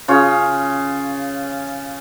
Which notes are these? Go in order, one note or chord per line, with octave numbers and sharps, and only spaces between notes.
C#3 F4 G#4 C#5